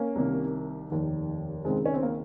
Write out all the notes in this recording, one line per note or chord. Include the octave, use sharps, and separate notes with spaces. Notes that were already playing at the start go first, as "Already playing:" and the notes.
Already playing: A#3 C#4
C2 C3 D#3
F1 D#2 D#3
C#2 C3 D#3 G#3 C4
C#4
C4
A#3